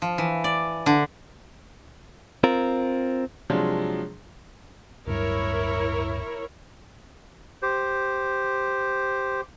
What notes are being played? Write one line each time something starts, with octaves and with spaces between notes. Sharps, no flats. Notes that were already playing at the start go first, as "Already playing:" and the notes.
F3
E3
D5
D3
C4 F4 A#4
C3 F3 F#3 G#3 D4
D1 G2 E4 A#4 C#5
G4 C5